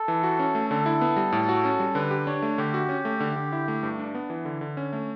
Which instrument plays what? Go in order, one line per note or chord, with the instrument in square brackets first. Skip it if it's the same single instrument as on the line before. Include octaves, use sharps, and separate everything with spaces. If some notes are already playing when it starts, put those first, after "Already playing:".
Already playing: [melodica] A4
[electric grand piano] E3
F#4
C#4
A3
[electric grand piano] D3 [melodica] A4
[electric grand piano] E4
B3
G3
A2
F#4
C#4
G3
[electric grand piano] D3 [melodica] B4
[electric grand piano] G4
[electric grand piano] D4 [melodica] C#5
[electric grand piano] A3
[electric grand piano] D3 [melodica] G4
[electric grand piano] F#4
C#4
A3
D3
D3
E4
A3
G2
D4
B3
E3
D3
D3
C#4
A3